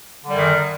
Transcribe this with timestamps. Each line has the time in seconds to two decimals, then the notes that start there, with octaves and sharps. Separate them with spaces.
0.25 D3
0.29 G3
0.33 F#2
0.37 D#3